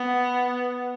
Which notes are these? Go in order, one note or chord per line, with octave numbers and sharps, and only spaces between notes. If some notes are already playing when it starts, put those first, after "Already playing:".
Already playing: B3